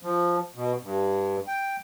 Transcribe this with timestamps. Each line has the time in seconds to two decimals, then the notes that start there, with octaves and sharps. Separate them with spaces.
0.03 F3
0.56 B2
0.83 G2
1.47 G5